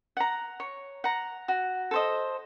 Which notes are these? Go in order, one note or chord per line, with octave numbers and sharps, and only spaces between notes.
F#5 A#5
C#5
F#5 A#5
F#4
A4 C5 D#5